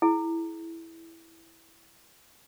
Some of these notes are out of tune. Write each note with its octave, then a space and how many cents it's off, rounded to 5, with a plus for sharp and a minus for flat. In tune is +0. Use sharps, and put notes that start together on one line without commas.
E4 +0 G#4 +35